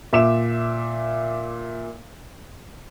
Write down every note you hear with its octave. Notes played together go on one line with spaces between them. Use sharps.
A#2 E5 D6 E7